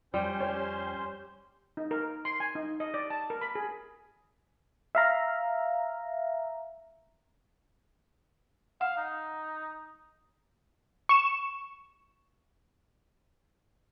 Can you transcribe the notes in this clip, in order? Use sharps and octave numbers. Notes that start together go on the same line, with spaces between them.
F2 G3 C#4 C5 C6
G4 C#5
D#4
A#4
C6
G#5
D#4
D#5
D5
A5
A#4
B5
G#4
E5 F5 A#5
F5 F#5
D#4
C#6 E7